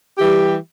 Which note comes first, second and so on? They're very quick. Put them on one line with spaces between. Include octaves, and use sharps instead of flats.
G4 E3 G3